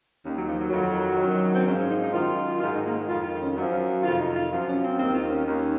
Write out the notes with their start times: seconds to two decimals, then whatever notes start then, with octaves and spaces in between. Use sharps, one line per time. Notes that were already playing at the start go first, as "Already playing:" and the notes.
0.23 D#2 D#3 C#4
0.35 F#3
0.47 F3
0.58 F#3
0.70 F2 D#3 F#3
1.17 F#2 D#3
1.54 C4
1.65 G#2 F3 C#4
1.77 C#4
1.90 D#4
2.01 D#4
2.13 F#2 D#3 F4
2.60 G#2 D#3 F4
2.73 D#4
2.84 A#3
2.96 G#3
3.08 F2 D#3 F4
3.23 F4
3.33 D#4
3.39 C#4
3.55 F#2 F3 F#3
3.71 F4
3.87 F#4
4.02 F2 C3 D#3 F4
4.18 D#4
4.34 F4
4.50 F#2 F3 F4
4.66 C#4
4.82 C4
4.97 D#2 D#3 C4
5.13 F4
5.29 C#4
5.45 D#2 D#3 C#4